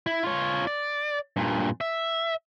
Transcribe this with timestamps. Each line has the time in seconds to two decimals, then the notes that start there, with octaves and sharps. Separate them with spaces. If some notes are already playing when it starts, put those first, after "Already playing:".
0.06 E4
0.23 F4 C#5
0.67 D5
1.37 G2 A#2
1.81 E5